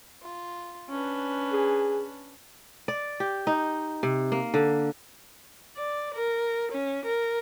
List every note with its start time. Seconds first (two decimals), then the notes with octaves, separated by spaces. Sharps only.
0.22 F4
0.89 C#4 D4 B4
1.52 G#4
2.88 D5
3.20 G4
3.47 D#4
4.03 C3
4.32 A#3
4.54 D3
5.77 D5
6.14 A#4
6.72 C#4
7.05 A#4